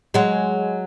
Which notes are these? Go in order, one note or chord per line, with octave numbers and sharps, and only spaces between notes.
F#3 G#3